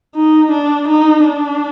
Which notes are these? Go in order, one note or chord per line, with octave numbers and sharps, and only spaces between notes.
D#4
D4
D#4
D4